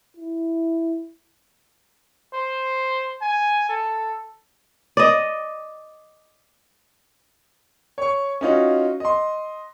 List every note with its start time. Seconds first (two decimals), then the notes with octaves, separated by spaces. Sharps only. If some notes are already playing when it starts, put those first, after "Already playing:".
0.17 E4
2.33 C5
3.21 G#5
3.69 A4
4.97 D5 D#5
7.98 C#5 C#6
8.41 C#4 D#4 F4 F#4
9.00 D#5 C6